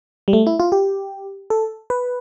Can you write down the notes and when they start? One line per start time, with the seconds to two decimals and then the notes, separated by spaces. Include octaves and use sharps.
0.28 G3
0.33 A3
0.47 E4
0.60 F4
0.72 G4
1.50 A4
1.90 B4